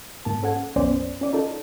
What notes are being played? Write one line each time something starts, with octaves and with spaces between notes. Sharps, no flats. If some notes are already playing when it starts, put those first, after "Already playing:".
G#2 A#3 A5 A6
C#4 A4 F#5 G#6 C#7
B1 F#2 B3 C#4 C5 D5
C#4 D5 D#7
D#4 F4 A4